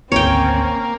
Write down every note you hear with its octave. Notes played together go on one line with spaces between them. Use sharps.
G#1 D2 A#3 C4 C#4 C#5 G5